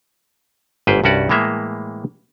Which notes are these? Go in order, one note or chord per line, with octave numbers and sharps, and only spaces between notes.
G1 G#2 B4 C5 G5
C2 G2 C#4 F#4 D5
A2 E3 G#3 A#3 E5